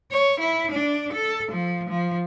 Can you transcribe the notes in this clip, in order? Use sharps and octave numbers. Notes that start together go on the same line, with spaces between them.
C#5
E4
D4
A4
F3
F3